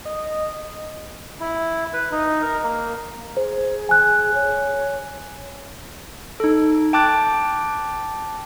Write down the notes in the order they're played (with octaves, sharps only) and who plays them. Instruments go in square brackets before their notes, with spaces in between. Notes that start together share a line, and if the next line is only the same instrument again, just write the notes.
[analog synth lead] D#5
[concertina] E4
B4
D#4
A#4
A#3
[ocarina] G#4 [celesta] C5
[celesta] G#5 F#6
[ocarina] C#5
[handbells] D#4 A4
G5 A5 D6 F#6 A6